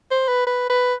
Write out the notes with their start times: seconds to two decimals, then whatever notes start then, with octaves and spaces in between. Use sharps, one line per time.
0.11 C5
0.28 B4
0.47 B4
0.70 B4